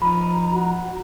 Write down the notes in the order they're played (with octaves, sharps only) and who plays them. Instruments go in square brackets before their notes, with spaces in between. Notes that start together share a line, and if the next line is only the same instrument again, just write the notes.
[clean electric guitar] F3 D#4 [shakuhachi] A#5 [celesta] B5
[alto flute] F#4